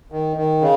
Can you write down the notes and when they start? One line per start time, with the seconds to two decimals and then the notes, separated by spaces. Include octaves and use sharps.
0.12 D#3
0.37 D#3
0.61 C#3